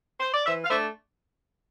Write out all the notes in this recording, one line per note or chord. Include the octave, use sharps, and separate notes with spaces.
C5
D5
E3 C5 E5
F5
A3 D4 C5 E5